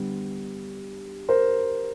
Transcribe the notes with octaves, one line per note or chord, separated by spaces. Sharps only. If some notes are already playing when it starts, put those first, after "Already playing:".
Already playing: D3 G3 B3
A#4 C5